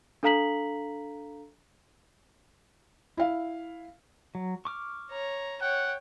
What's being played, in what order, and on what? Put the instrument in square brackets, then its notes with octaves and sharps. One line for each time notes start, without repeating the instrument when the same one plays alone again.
[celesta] D4 A4 F5 A#5 B6 F#7
[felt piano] E4 F5
[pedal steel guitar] F#3
C#6 D6 F6
[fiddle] C#5 A#5
[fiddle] C#5 G5 [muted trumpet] F#5